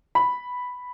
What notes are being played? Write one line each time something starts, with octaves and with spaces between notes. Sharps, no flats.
B5